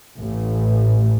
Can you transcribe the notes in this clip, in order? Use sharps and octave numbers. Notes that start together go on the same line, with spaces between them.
A1